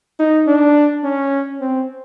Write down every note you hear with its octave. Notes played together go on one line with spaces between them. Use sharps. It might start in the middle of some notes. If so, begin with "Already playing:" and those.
D#4
D4
C#4
C4